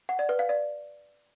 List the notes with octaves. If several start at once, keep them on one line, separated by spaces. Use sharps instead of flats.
F#5
D5
B4
F5
D5